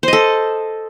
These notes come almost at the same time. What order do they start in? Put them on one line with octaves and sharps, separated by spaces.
C5 D#5 A4